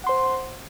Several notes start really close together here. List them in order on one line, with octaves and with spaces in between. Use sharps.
F#5 C6 C5